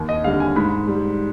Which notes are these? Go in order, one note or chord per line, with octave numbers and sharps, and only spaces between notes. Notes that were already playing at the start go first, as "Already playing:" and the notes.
Already playing: D#2
D#5
D3 G3 F5
G#5
G#2 B5
G3